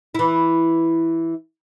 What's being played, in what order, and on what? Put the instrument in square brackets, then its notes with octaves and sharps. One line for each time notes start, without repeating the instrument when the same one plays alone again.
[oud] E3 E4